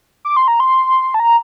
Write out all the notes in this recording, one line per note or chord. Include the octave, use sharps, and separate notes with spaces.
D6
C6
A#5
C6
A5
A#5